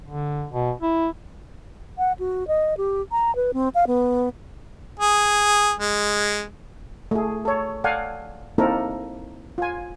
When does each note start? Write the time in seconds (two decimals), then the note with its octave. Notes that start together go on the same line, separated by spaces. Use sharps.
0.06 D3
0.53 B2
0.81 E4
1.98 F#5
2.19 F#4
2.48 D#5
2.77 G4
3.12 A#5
3.36 B4
3.54 C4
3.75 F5
3.87 B3
5.00 G#4
5.79 G#3
7.11 A3 G#4
7.45 A4 C#5
7.84 A4 D5 F5 F#5 G#5
8.58 A#3 C4 D#4 E4 A4 A#4
9.58 F4 G#5